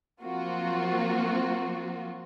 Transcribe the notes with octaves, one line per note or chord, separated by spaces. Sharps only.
F3 F#3 A#3 C4 F4 F#4